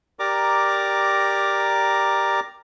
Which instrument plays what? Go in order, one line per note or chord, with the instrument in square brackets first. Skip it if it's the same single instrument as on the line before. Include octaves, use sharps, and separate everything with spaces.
[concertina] G4 A#4 D5 A#5 D6